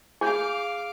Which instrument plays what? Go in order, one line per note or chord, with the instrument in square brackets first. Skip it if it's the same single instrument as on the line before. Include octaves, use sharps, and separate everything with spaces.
[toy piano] G#4 [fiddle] F5 D6 [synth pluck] G#5 C6 G6